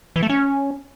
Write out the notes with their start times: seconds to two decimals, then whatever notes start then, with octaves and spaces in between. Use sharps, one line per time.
0.16 E3
0.23 A3
0.30 C#4